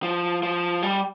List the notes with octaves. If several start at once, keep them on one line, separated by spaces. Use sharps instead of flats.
F3
F3
G3